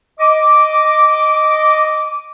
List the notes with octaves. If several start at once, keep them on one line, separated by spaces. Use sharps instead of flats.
D#5 D6